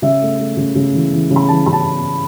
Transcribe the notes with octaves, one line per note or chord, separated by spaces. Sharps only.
C#3 E5
A3
A3
C#3
C#3
E3
E3
C#3
B5
E3 A5
C#3 B5
A5